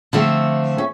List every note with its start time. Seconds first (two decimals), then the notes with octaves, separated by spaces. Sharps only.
0.13 D3 F3 A3 C4
0.78 C#4